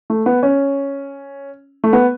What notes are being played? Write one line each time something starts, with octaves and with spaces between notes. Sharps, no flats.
A3
B3
C#4
A3
B3